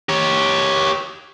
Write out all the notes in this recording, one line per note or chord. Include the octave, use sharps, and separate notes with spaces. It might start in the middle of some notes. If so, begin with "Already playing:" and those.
G4 C#5